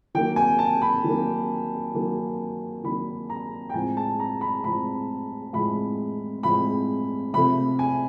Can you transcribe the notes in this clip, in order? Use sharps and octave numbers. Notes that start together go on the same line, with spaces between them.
D#3 F#3 A#3 G5
G#5
A5
B5
D#3 F#3 A#3
D#3 F#3 A#3
D#3 F#3 A#3 B5
A#5
G5
A2 F3 G#3 C4 G#5
A5
A#5
B5
A2 F3 G#3 C4 B5
A2 F3 G#3 C4 B5
A2 F3 G#3 C4 B5
C3 F3 A3 B5
G#5